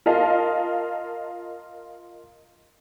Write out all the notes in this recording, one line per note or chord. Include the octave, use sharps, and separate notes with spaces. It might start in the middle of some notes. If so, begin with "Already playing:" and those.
F4 A#4 D#5 F5 A5